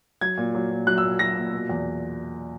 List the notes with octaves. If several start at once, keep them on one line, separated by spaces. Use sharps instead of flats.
F#3 G#6
A#2
F#3
A#2
F#3 F#6
E6
A#2
F#3 A#6
A#2
B2
E2